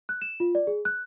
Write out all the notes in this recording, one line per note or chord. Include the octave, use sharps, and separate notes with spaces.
F#6
E7
F4
D5
G#4
F#6